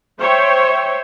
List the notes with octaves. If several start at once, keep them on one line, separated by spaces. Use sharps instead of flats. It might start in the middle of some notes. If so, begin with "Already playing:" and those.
C5 C#5 E5 G5